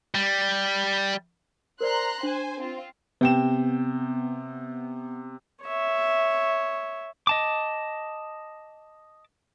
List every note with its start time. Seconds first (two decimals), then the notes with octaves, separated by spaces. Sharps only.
0.15 G3
1.81 A#4 C5 D5 A#5 C6 F#6
2.23 D4 C5 G#5
2.60 C4 F4
3.21 C3 B3 G5 E7
5.64 C#5 E5
7.27 D#5 A5 D6